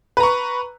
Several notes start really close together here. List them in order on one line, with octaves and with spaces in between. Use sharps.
B4 A#5 C#6